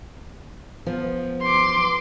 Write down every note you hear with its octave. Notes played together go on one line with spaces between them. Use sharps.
F3 B3
C6 D6